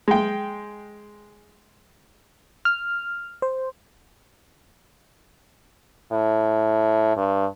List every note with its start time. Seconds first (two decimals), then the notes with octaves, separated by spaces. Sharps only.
0.08 G#3 G5
2.65 F6
3.42 C5
6.12 A2
7.17 G2